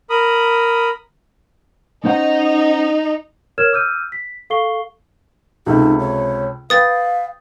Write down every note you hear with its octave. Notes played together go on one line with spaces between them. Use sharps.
A#4 B5 D#6
C#4 D#4 C5 F#5
A#4 C#5 E6 F6 G#6 E7
D6 E6 F6 G6 D#7
B6
A4 F5 C#6 C7 G7
C#2 C3 D#4 A4
C#5
B4 F5 G5 D#6 A6